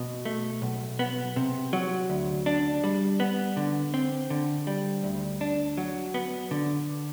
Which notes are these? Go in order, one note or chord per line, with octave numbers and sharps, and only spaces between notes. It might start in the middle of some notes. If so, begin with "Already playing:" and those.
Already playing: B2
A3
B1
B3
C3
F#3
D2
D4
G3
B3
D3
C4
D3
G3
D2
D4
F#3
B3
D3